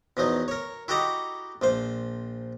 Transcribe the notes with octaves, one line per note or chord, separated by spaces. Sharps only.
E2 F3 F#3 D#4
A#4 C#5
E4 F#4 G4 A4 D#5 A#5
A#1 F3 C5